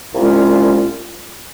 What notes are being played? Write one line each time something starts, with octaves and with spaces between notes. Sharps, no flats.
C2 A#2 G#3 C#4 F4